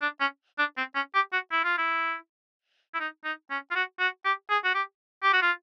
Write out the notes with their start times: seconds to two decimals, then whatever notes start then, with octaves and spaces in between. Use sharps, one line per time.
0.02 D4
0.20 C#4
0.58 D4
0.77 C4
0.95 C#4
1.14 G4
1.32 F#4
1.52 E4
1.64 F4
1.78 E4
2.94 E4
3.00 D#4
3.24 D#4
3.50 C#4
3.70 F4
3.75 F#4
4.00 F#4
4.25 G4
4.50 G#4
4.64 F#4
4.74 G4
5.23 G4
5.33 F#4
5.42 F4